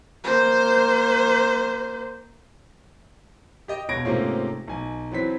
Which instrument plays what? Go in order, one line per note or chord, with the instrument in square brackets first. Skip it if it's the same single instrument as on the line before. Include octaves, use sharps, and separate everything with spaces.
[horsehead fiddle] A#3 C5
[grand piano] G4 D#5 G5
E1 B2 C#5 G#6 A#6 D7
G#2 C3 A3 A#3 C#4 F4
B1 G#5
E3 F#3 C4 B6